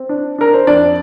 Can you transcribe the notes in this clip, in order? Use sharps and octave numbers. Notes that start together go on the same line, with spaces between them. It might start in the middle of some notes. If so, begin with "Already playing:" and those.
Already playing: C4
D4
D4 A#4
C5
F2 D4 D5